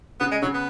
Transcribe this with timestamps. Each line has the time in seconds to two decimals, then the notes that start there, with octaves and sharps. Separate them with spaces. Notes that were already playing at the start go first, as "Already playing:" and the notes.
0.20 C#3 B3
0.32 G#3
0.42 C#3 F#3
0.54 B3